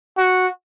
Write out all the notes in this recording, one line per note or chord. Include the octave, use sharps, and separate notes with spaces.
F#4